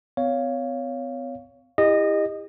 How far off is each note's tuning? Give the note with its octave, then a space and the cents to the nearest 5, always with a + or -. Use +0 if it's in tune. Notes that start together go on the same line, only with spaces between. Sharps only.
B3 +45 C#5 +10 F5 +0
E4 +0 G4 +40 D#5 -15